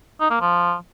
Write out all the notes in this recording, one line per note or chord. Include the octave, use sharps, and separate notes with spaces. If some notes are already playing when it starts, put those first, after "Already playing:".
D#4
A#3
F3